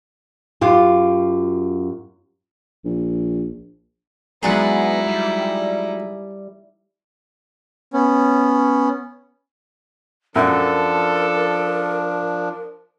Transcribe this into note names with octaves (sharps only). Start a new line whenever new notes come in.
F#2 F4 G4
A#1
F#3 G#3 B3 D#4 E4 G#4 D5 F#5
G3
B3 C#4
F#2 F3 D4 A4 A#4